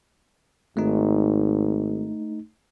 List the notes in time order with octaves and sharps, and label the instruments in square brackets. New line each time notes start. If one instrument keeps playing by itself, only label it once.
[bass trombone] G#1 [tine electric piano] A3 D#4